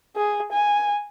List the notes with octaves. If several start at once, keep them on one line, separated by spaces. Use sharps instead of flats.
G#4
G#5